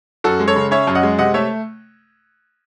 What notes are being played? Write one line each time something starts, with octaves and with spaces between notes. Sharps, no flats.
F#2 F#4 A4
G#3
A4 C#5
C#3
C#4 C#5 E5
F#2
D#5 F#5
G#3
C3 D#5 F#5
A3 C#5 E5